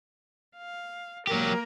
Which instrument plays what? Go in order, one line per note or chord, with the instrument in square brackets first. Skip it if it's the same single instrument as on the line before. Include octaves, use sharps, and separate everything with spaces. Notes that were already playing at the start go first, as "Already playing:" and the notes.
[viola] F5
[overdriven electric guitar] F#3 G4 [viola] A#3 A#4